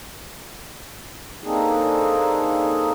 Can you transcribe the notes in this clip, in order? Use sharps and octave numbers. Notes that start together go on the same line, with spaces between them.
A#3 C4 D4 D#4 G#4 A4